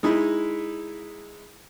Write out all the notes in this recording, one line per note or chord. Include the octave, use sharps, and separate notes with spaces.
G#3 D#4 E4